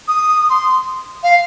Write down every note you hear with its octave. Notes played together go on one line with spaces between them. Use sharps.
D#6
C6
F5